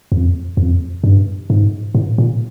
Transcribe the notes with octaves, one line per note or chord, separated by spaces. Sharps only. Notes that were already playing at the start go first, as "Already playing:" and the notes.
F2
F2
G2
G#2
A2
A#2